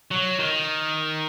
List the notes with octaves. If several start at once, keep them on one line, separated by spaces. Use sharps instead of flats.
F#3
D#3